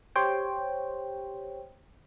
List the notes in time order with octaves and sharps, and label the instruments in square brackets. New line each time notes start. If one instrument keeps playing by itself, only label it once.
[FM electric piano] G4 C5 C#5 G5